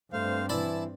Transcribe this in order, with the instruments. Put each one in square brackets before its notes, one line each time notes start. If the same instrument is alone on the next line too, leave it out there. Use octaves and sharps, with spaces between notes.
[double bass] G2 C4 [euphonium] A3 [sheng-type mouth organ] C5 F5
[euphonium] E3 [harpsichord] E4 D5 [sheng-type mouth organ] A5